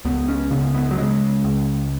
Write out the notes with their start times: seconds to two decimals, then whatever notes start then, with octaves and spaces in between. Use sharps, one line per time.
0.05 C#2 B3
0.28 C#4
0.51 C#3 B3
0.74 B3
0.91 F#3
0.98 C#3 G#3
1.44 C#2